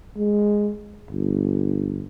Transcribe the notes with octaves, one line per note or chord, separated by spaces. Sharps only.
G#3
G1